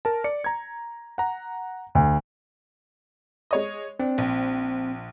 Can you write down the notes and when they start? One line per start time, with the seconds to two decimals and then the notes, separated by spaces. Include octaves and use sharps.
0.05 A#4 A5
0.24 D5 C#7
0.44 A#5 G#6
1.18 F#5 A#5
1.95 D2
3.51 G#3 C#5 D#5
4.00 C4 D4
4.18 A#1